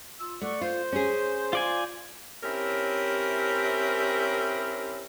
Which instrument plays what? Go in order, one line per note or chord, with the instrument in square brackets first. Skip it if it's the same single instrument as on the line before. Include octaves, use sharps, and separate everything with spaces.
[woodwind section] F4 E6
[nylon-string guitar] A3 [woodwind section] D5 F#5 C#6
[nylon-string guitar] F4 [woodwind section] C5
[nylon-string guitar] C#4 G#4
[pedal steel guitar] F4 D5 G#5
[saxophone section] C4 C#4 E4 G4 A#4